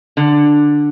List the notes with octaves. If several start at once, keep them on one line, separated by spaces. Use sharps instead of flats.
D3